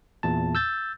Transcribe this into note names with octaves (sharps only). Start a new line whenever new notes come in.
E2 A#2 A5
E6 G6 A6